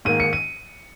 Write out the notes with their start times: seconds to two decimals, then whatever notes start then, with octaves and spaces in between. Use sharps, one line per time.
0.05 G#2 D#3 A#3 D#7
0.20 C#7
0.33 D#7